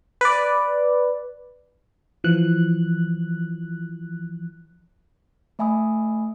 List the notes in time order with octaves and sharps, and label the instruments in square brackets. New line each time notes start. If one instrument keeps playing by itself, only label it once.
[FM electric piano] B4 D5
E3 F3 F#6
[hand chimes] A3 E5 G#5 B5 D#6